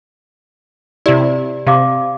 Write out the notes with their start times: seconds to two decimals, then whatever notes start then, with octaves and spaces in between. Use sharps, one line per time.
1.06 C3 E4 G4 D5
1.67 C3 G4 F5 D6